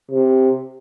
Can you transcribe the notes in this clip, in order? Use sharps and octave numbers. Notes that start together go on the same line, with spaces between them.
C3